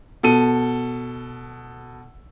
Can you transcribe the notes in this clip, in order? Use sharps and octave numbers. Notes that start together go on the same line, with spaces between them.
B2 A4 D#7